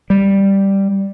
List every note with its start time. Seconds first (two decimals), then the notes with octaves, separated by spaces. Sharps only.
0.10 G3